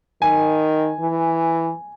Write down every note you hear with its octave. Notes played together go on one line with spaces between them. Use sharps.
D#3 G#5
E3